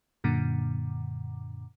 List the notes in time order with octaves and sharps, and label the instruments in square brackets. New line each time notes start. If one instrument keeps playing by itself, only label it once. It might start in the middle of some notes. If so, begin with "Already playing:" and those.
[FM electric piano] F#2 A#2 D3